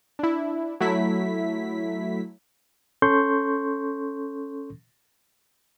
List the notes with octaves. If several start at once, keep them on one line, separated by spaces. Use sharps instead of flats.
D4 E4
F#3 A3 E4 B6
C#4 A4 C6 C#6 G6